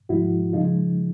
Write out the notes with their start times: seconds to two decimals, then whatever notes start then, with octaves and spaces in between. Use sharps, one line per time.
0.09 G#2 F3 G#3 E4 F#4
0.53 C#3 F3 G#3 D#4 F4